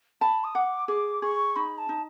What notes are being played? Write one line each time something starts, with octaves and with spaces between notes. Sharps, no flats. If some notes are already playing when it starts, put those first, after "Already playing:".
A5 B5
D#6
F#5 D6
G#4 D6
G#4 C#6
D#4 B5
A5
D#4